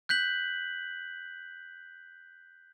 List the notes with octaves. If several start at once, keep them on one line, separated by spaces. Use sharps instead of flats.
F#6 G6 B6 F#7